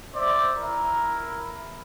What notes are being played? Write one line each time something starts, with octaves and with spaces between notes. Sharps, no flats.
C5 D5 E5
E4 A#4